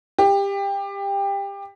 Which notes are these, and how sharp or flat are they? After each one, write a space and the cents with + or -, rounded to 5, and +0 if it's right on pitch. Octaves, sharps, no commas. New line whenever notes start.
G4 +20